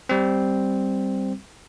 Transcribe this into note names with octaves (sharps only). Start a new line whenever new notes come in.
G3 C4